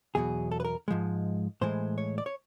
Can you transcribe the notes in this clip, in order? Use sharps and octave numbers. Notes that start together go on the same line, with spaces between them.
E2 B2 F#3 G#4
A4
B4
A#4
G#2 F3 G#3
A2 E3 G#3 C5
C#5
D5
C#5